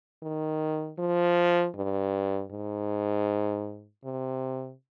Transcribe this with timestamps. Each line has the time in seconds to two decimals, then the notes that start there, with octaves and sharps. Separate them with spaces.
0.23 D#3
0.99 F3
1.75 G2
2.51 G#2
4.04 C3